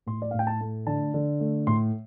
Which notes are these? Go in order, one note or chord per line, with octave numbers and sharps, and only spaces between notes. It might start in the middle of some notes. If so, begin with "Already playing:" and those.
A2 C6
D5
A2 F5
G5
A5
A3
D3 A5
D3
A3
A2 C6